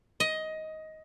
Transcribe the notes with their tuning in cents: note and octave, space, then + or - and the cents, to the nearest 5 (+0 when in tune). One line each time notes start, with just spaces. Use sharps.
D#5 +15